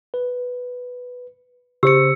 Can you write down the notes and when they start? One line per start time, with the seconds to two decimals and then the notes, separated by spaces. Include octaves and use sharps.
0.14 B4
1.83 C#3 G4 C5 E6 C#7